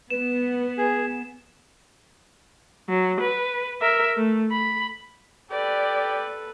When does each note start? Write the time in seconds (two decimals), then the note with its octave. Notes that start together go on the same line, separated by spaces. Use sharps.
0.10 B3 B4 E7
0.78 G#4
2.89 F#3
3.21 B4
3.82 A#4 E5
4.17 A3
4.52 B5
5.51 G4 A4 B4 D5